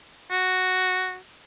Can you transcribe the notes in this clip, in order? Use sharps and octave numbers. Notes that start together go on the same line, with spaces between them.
F#4